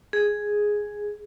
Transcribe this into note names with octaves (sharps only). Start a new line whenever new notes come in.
G#4